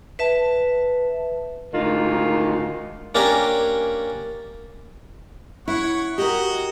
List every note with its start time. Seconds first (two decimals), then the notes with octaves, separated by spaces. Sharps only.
0.19 B4 E5 A5
1.73 D2 G#2 D#3 F4
3.15 A#3 C#4 D4 G4 G#5 A#5
5.68 E4 C#5 F#5
6.18 F#4 G4 A#4 D#5